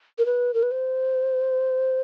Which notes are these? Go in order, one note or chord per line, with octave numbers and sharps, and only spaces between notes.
A#4
B4
A#4
B4
C5